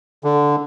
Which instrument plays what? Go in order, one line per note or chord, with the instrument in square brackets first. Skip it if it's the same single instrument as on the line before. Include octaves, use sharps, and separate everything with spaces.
[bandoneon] D3